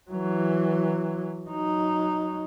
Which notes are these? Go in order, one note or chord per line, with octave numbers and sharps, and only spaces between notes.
E3 F#3
F#3 D#4